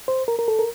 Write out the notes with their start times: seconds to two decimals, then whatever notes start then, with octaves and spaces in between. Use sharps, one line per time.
0.08 C5
0.28 A#4
0.39 A#4
0.48 A4
0.59 A#4